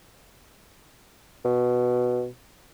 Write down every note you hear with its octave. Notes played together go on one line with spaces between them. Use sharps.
B2